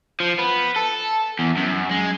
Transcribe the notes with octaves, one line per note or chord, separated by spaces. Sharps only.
F3
B3
A4
E2
F#2
G#3